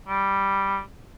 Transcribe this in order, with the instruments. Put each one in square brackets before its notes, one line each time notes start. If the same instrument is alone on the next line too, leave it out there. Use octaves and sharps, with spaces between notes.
[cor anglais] G3